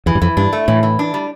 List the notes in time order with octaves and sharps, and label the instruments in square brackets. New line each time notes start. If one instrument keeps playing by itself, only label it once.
[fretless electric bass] E2 [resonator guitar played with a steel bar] E3
[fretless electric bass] G2
[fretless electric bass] F2 [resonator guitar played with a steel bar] E3
[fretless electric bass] G2 [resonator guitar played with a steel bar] D4
[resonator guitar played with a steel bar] A3
[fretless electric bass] A2 [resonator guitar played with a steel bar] E3
[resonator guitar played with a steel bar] E3
D4
G3